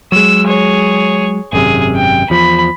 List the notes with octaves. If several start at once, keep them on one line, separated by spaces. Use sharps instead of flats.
F#3 G#3 E6
G#4 C#5
G#1 F#2 C3 G#4
G5
E2 F3 B5